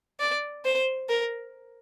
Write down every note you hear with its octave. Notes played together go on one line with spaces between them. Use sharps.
D5
C5
A#4